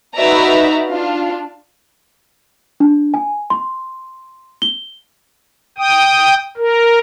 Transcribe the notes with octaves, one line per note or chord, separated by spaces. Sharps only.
D#4 F#4 B4 D5 E5 A#5
D4 F4
D4
G#5
C6
G7
G5 D#6
A#4